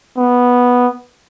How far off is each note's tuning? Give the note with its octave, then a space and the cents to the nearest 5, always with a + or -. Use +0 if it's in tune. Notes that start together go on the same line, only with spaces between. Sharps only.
B3 -5